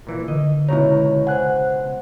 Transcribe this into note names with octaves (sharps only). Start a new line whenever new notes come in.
A#2 E3 A#3
D3 D#5
C#2 B2 E4 C#5 A#5
C5 F#5 G#5 F#6